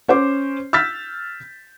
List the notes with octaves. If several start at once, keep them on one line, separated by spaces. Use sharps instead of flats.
C#4 C5 D6
E6 F6 G6 A6 B6